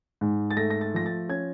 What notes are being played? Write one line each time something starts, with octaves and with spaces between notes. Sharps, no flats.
G#2
A6
A3 A#6
A#6
A6
F3 A#6
A6
C#4 G#6